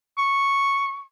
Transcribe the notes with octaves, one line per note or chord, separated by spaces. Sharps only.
C#6